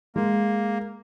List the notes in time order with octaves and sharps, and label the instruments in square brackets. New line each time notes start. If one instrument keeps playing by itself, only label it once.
[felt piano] G#3 [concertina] A#3